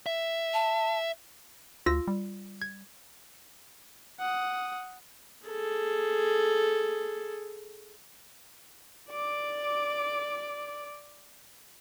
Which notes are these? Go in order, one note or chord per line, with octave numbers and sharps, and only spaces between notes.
E5
A5
D2 F4 E6 A#6
G3
G#6
F#5 D#6
G#4 A4
D5 D6